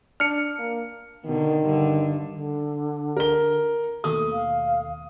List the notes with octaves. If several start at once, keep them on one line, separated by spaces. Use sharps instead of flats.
D4 F6 C#7
A#3
B2 D3 D#3
G2 D3
D3
A#4 G7
D#2 B2 A3 D#6
F5